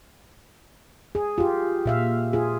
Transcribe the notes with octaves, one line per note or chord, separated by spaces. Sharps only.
G#4
F4 G4
A#2 E5 F5
F4 G#4